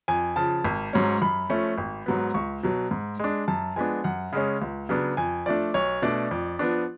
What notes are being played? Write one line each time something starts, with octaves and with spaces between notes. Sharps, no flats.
F2 G#5
C#3 F3 A5
G#1
G#2 F#3 C#4
F#2 B5
F3 A3 C#4
G#1
G#2 F#3 B3
C#2 C#6
B2 F#3
G#2
G#3 D4
F#2 A5
F3 G#3 B3 D4 G#5
F#2 F#5
C#3 G#3 C#4
C#2
C#3 F#3 B3 D4
F2 G#5
F3 A3 D4 D5
B1 C#5
B2 A3 D4 D5
F2
F3 B3 D4